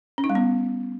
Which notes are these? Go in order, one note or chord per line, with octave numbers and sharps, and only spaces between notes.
C#4
D#4
G3
B3